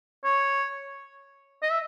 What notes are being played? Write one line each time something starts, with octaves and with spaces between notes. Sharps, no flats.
C#5
D#5
E5